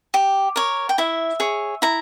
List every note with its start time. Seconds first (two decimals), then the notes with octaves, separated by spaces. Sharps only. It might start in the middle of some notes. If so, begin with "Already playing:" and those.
0.14 G4
0.56 A#4 C#5
0.89 G5
0.98 E4 E5
1.40 G#4 C#5
1.82 E4 A#5